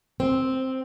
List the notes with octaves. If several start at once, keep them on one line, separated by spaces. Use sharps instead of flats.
C4